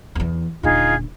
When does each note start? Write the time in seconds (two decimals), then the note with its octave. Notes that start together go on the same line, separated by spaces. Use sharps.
0.15 E2 E3
0.63 D#1 D3 D#4 F4 G#4